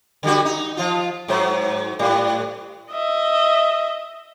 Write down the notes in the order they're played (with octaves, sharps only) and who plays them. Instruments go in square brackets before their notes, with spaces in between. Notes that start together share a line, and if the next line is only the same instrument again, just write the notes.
[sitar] D3 G3 F#4
D#4
F3 F4
G#2 F#3 C5
A2 G3
[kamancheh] D#5 E5